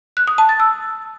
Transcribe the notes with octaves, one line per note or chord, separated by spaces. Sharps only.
F#6
D#6
A5
A6
E6